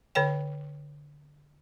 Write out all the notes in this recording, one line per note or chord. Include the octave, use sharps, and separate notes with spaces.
D3 A4 C#5 G5